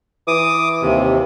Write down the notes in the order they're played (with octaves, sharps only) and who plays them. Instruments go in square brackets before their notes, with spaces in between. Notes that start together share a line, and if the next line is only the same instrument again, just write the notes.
[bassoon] E3 [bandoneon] D6 D#6
[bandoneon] D#2 C3